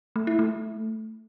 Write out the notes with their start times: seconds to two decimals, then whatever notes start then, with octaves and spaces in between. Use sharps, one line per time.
0.16 A3
0.27 E4
0.39 A3